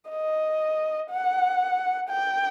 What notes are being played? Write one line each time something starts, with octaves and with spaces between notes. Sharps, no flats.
D#5
F#5
G5